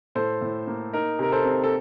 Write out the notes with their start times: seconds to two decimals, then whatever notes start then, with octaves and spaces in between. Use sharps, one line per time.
0.15 A2 A4 C5
0.41 A2
0.67 A#3
0.93 D#4 A#4
1.19 C3 A#4
1.32 A4 C5
1.45 C4
1.64 A4